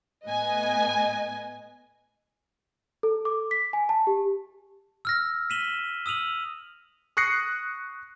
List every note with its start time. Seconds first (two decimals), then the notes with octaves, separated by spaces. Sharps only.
0.24 A2 B3 D#5 G#5
3.03 A4
3.25 D6
3.51 B6
3.73 G#5
3.89 A5
4.07 G4
5.05 E6 F6 A#6
5.50 B6 D#7 E7 F#7 G7
6.06 D#6 E6 D#7 F7 F#7
7.17 C#6 D#6 F#6 A#6 C7 C#7